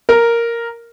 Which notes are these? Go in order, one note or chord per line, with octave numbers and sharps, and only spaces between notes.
A#4